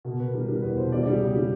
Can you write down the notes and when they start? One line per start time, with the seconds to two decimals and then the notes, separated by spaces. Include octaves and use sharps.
0.05 B2 A#4
0.19 B2 B4
0.33 G3 A#4
0.48 G3 A#4
0.62 E2 B4
0.77 B2 C5
0.91 G3 D5
1.03 G3 D5
1.13 G#4
1.21 C#3 G4
1.35 G3